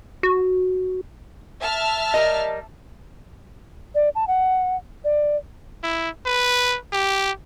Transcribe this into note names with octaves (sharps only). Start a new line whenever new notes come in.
F#4
E5 A5 F6
G3 A#4 D#5
D5
A5
F#5
D5
E4
B4
G4